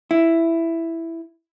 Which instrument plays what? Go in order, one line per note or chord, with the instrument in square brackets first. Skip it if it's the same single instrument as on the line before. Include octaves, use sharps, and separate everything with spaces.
[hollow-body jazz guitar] E4